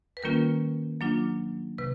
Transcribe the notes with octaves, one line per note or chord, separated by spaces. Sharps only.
B4
D#3 G3 A#3 C#4 F4 A#4
F#3 A#3 D4 F4
C3 B4